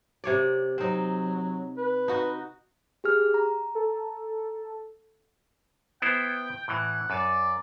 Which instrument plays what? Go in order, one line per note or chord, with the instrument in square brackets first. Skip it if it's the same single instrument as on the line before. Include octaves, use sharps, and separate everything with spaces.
[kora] C3 C#5 D5
[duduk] F#3 [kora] C4 D#4
[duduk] B4
[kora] D#4 F#4
[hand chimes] G4 G#4 F6
A#5
[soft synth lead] A4
[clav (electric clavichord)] B3 E4 C5 [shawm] G5
[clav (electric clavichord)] A2 E3 [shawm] F#5
[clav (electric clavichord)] F#2 [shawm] D5